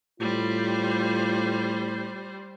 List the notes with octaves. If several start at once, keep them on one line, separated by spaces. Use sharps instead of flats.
A2 G3 F4 C5